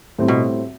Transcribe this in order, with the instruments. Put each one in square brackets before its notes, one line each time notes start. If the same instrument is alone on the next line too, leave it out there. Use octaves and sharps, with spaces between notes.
[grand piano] A2 G3 C4
[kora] B2